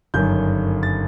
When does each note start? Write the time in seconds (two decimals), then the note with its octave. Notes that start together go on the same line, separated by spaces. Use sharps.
0.14 G1 F#2 D#3 G6
0.83 A6